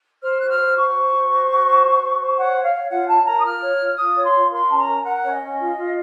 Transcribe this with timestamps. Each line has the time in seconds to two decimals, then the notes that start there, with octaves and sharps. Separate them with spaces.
0.22 C5 F6
0.40 F#4 F#6
0.49 F6
0.59 C5
0.75 F#4 C#6
0.94 C5
1.11 F#4
1.30 C5
1.47 F#4
1.65 C5
1.83 F#4
2.00 C5
2.19 C5
2.36 C#5 F#5
2.55 C#5
2.63 F5
2.73 C#5
2.90 F4 F#5
3.08 C#5 A5
3.25 A#4 A#5
3.38 D#6
3.43 F4 F6
3.61 C#5
3.79 F4
3.97 F4 D#6
4.15 C#5
4.24 C6
4.33 F4
4.50 A#4 C6
4.69 C#4 A5
4.77 A#5
4.87 A#4
5.03 A#4 F#5
5.22 C#4 C#5
5.30 D#5
5.40 C#4
5.58 F4
5.75 F4